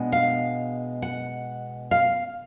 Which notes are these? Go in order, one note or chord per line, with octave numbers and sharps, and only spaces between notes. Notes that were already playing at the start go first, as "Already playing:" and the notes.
Already playing: B2 G#3 B3 D4
F5
F#5
F5